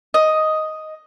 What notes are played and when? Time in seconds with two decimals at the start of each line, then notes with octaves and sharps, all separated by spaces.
0.14 D#5